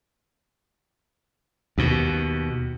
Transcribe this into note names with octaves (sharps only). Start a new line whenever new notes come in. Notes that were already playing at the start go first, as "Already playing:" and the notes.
D#2 B2